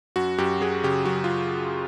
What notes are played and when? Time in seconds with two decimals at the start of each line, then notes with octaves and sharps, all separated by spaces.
0.16 F#2 F#4
0.38 F#2 G4
0.61 F#3 G#4
0.84 C#3 G4
1.05 F#2 F#4
1.24 F4